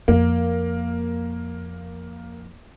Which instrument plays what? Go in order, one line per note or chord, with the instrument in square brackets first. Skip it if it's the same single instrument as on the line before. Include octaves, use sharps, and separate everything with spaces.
[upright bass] F2 [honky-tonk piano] A#3